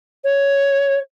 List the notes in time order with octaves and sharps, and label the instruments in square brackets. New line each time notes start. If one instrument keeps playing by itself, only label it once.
[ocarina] C#5